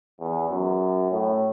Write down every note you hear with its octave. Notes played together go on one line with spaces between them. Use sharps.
E2
F#2
A2